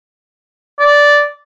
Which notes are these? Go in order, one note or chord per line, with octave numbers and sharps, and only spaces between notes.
D5